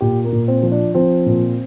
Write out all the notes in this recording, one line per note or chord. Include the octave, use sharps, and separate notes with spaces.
A#2 G4
A#3
A#2
C4
F3
D4
F3 C4
A#2